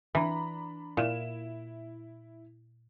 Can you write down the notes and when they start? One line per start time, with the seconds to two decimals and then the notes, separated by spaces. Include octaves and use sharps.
0.15 E3 D4 A#5 B5
0.97 A#2 E4 E7